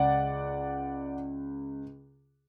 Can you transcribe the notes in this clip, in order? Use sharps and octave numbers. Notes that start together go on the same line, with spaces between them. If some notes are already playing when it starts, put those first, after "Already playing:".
Already playing: C#2 D5 F#5